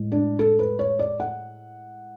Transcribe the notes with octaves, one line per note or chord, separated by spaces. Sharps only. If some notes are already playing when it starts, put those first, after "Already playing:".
Already playing: A2 G#3
D4
A4
B4
C#5
D5
F#5